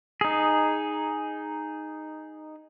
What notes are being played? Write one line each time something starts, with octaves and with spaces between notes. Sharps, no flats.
D#4 G#4